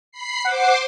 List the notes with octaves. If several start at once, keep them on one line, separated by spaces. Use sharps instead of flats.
B5 C7
C5 F#5 C6 D6